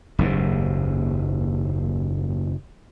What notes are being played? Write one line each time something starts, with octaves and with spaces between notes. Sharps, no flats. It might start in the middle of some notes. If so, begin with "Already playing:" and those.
F#1 D#2 G#2